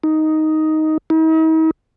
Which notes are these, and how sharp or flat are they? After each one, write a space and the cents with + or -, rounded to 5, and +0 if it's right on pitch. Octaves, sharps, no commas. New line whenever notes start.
D#4 +5
D#4 +45